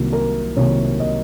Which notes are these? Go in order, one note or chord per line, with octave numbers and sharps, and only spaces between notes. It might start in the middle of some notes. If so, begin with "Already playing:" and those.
Already playing: C2 C3 D#3 F#3 A#3
A#4
C2 C3 D#3 F#3 A#3 C#5
D#5